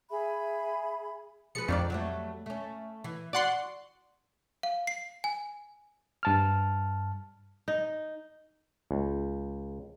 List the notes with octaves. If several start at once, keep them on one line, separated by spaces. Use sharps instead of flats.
G#4 E5 B5
F3 G#4 B4 C#7
F2 D4 C#5 D5
F#3 G3 A3
A3 C#4
E3
F#4 D5 F#5 C6
F5
C7
G#5
G2 A5 F6
D#4
C#2